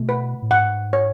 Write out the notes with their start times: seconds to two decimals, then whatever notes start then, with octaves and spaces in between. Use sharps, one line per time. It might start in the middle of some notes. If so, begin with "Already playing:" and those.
Already playing: B2 A3
0.09 B4
0.42 A2
0.51 G#2 F#5
0.93 C#5